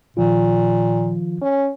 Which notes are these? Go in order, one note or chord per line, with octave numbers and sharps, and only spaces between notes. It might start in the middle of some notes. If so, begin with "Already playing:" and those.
A#2 D#3 F3 F4
C#4